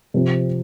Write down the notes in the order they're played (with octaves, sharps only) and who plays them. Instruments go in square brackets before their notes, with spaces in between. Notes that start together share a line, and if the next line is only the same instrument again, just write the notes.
[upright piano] C3 F3 C4